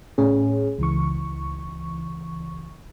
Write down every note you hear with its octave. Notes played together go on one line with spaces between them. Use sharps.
A2 C#4 G#4
C#2 E3 C#6